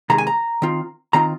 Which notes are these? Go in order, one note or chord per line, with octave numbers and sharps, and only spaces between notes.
C3 D#3 G#3 A#5
G#5
A#5
D#3 C4 F4
D#3 C4 F4 A#5